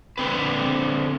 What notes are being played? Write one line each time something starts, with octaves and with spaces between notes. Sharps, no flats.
D3 C4 B4